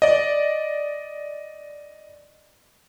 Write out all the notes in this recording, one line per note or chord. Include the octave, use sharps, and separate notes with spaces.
D5 D#5